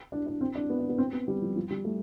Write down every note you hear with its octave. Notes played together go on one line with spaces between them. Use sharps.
D4
D4
C4
D4
B3
D4
B3
C4
B3
G3
F3
F3
G3
A3